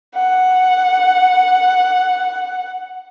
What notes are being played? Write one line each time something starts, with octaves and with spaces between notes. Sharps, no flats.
F#5